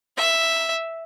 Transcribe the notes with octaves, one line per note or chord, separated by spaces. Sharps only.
E5